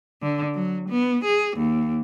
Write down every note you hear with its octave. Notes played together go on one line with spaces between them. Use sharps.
D3
F#3
B3
G#4
D#2